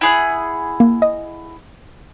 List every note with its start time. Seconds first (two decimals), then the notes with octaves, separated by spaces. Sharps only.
0.01 E4 G#4 F#5
0.80 A#3
1.02 D#5